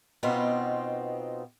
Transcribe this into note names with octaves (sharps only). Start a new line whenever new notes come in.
B2 B3 C4 D#4 F4